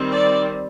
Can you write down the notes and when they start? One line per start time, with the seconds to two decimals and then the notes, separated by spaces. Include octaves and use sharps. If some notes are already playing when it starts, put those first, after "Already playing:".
Already playing: D#3 G3 C4
0.12 D5